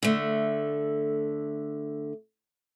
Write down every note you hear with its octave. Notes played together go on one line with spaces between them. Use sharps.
D3 A3